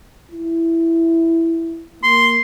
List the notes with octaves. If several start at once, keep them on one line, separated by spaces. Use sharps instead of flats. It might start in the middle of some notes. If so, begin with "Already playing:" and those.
E4
A#3 C6